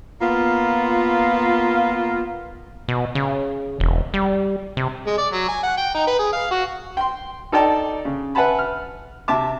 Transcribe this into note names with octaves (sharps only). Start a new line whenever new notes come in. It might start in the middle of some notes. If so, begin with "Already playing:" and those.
A#3 B3 F4
B2
C#3
E1
G3
C3
G#3
D5
F#3
G#5
F#5
G5
D#4
B4
G#4
F5
F#4
G5 C6
D#4 A4 D5 G5 A5
C#3
B4 E5 F#5 G#5 A5 B5
F6
C3 E5 A5 D6